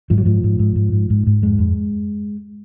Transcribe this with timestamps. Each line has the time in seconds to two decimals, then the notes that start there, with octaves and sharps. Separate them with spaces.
0.10 G#2 F3
0.18 F#3
0.25 G#2 F3
0.44 G#2
0.59 G#2
0.76 G#2
0.93 G#2
1.10 G#2
1.27 G#2
1.42 F2 G#3
1.59 F2